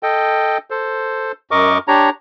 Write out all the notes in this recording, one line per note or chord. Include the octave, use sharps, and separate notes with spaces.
A4 D#5 G5
A4 C5
F#2 A#4 D#5 C#6 D6
D4 G4 C#5 A#5